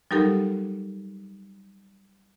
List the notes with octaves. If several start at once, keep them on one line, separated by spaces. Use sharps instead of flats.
F#3 G3 D#4 G4 A4 A#4